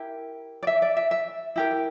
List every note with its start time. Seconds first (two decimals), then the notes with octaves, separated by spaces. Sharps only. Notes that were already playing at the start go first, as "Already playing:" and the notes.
Already playing: E4 G4 A#4
0.63 D5
0.67 E5
0.82 D5
0.97 E5
1.11 E5
1.56 E4 G4 A#4